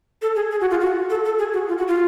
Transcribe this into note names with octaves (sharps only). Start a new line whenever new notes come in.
A4
G#4
G#4
F#4
F4
F#4
A4
A4
G#4
F#4
F4
F#4
F4